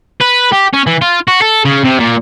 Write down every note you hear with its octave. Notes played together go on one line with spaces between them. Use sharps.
B4
G4
C#4
E3
F4
F#4
A4
C#3
C3
A#2